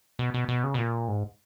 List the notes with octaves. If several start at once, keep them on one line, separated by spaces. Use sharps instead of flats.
B2
B2
B2
C#3
B2
A#2
G#2